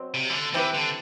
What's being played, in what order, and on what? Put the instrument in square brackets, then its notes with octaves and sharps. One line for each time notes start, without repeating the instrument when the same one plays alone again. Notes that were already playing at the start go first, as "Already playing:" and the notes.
Already playing: [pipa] B2 F#3 C4
[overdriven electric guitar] C3
E3
D3
[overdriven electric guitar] E3 [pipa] C4 E4 G4 B4
[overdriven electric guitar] D3